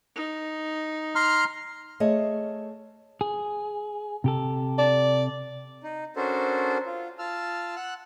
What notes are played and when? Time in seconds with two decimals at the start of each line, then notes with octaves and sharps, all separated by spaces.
0.16 D#4
1.15 A#5 C6 F6
2.00 A3 G#4 C#5 D#5
3.21 G#4
4.24 C3 G4 A4
4.78 D5
5.83 D#4
6.16 C#4 D4 F#4 A4 A#4 C5
6.86 F4
7.19 F4 A5 E6 F6
7.76 F#5 E6 F#6